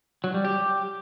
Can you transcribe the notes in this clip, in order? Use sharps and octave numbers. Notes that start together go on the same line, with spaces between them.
F#3
G3
G4